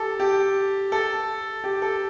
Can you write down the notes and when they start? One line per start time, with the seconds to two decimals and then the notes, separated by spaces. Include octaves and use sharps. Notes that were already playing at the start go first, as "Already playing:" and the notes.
Already playing: G4 A4
0.20 G4
0.92 A4
1.64 G4
1.82 A4